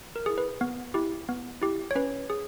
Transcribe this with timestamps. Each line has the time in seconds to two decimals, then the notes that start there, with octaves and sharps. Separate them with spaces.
0.16 A#4
0.26 E4 G#4
0.38 B4
0.61 B3
0.94 E4 G4
1.29 B3
1.62 E4 G4
1.91 C#5
1.95 C#4 B4
2.30 G#4